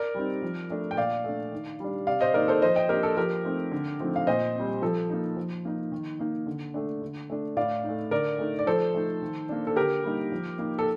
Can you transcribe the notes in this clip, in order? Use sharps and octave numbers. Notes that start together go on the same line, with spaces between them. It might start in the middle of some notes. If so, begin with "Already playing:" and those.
Already playing: A#4 D5
G3 C4 D#4
F3
A3 D4
G5
A#2 D5 F5
A3 D4
D#3
G3 D4
C3 D5 F5
C5 D#5
D#3 A#3 D#4 A#4 D5
A4 C5
F3 C5 D#5
D#5 G5
A#3 D4 G4 A#4
A4
F3 G4 A#4
A3 C4 D#4
D3
F3 A3 C4 D#4
F5
A#2 C5 D#5
C4
G3
F3 A4
A#3 D#4
F3
A#3 D#4
D#3
A#3 D#4
D3
A3 D4
D3
A3 D4
A2 D5 F5
D#4
A3
D3 A#4 D5
A3 D#4
D5
F3 A4 C5
A3 D#4
D#3
A#3 D4
A4
D3 G4 A#4
G3 A#3 D#4
F3
A#3 D#4
A4